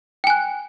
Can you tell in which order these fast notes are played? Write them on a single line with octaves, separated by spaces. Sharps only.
G5 G#5 F#6